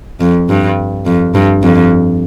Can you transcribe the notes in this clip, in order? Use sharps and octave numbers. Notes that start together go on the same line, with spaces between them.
F2
G2
F2
G2
F2